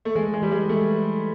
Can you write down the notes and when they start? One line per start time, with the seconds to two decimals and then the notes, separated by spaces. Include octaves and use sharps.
0.05 A3
0.15 E3 G#3
0.34 G#3
0.42 E3 G3
0.52 G#3
0.69 G#3 A3